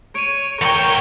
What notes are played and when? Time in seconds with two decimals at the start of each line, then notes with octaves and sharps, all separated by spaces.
0.15 C#5 D7 D#7
0.61 E2 A#4 C#5 G5 C#6 C#7